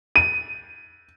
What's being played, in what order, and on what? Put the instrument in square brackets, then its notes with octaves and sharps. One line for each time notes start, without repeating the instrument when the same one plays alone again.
[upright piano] D#7